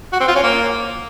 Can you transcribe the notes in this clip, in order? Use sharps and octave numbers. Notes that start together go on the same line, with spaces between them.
F#4
C4
F4
C#4
A#3